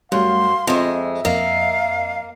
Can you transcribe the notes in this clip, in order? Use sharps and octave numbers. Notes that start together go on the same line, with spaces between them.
F#2 G3 A3 F5 C6
F2 G#3 F4 E5
F2 A#3 A#4 D#5 F5